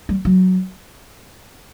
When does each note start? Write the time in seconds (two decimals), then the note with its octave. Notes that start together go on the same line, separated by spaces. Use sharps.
0.09 G3
0.25 F#3